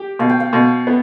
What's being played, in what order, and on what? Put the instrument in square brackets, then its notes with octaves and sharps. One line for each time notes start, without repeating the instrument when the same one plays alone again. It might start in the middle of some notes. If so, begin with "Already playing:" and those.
Already playing: [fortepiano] G4 [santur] G5
[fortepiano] B2 [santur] F5
[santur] G5
F5
[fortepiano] B2
B3